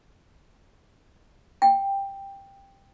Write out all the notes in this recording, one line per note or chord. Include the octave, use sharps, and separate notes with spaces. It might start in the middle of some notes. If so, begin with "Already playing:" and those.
G5